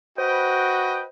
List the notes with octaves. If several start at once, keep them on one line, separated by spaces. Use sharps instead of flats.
F#4 B4 C5 D#5 G5